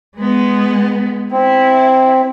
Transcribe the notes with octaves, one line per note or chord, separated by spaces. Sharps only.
G#3 B3
C4 E4